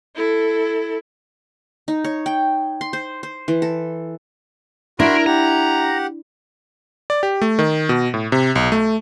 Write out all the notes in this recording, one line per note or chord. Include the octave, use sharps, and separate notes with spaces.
E4 A4
D#4
C#5
G5
C6
C5
C5
E3
A4
D4 E4 F#4 A#4 B5 C6
G4 F#5 A#5
D5
G4
A3
D#3
B2
A2
C3
B1
A3